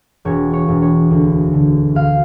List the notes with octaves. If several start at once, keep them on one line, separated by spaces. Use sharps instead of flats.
E1 C#5
C#5
E1
C#5
D2
D3
D2 F5